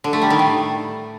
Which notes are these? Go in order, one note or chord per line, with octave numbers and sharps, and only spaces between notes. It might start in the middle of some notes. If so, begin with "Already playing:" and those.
D3
A3
G3
D#3
A2